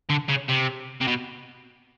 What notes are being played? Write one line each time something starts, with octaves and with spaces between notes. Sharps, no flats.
D3
C#3
C3
C3
B2